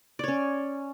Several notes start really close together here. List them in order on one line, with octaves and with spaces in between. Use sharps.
D5 C#5 C#4